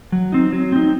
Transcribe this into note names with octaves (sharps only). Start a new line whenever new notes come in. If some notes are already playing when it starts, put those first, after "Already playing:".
F#3
C4 D#4
F#3
C4 D#4